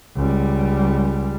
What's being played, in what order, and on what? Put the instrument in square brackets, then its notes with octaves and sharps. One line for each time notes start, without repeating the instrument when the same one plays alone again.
[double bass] C#2 G3